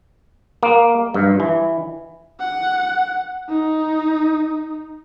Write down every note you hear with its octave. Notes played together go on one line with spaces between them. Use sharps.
A#3
G2
E3
F#5
D#4